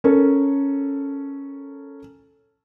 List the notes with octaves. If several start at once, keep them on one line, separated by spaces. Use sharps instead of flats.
C#4 A4 A#4